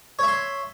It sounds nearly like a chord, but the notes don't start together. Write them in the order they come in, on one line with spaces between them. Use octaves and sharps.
C#5 E5 C6